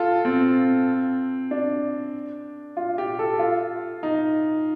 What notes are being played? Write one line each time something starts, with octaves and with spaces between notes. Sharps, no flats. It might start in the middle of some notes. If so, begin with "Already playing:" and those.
Already playing: F4 A4
C4
D4
F4
G4
A4
F4
D#4